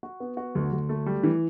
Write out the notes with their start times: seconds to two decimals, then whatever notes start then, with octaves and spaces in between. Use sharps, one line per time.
0.03 F#4
0.20 B3
0.37 F#4
0.55 D2
0.72 D2
0.89 A3
1.06 G3
1.24 E3